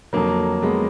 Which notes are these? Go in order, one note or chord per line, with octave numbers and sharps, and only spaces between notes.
F2 D3 F#3 A#3
G#3 B3